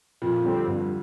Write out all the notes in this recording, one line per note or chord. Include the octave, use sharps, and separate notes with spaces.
F2 A#2 F3
F3
D3 G3 C4
G2 D3